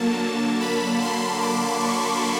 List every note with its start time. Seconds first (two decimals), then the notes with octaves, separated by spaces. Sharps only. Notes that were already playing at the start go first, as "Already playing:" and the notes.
Already playing: D3 F#3 A#3 A5
0.61 B5
1.02 C6
1.41 D6
1.80 C#6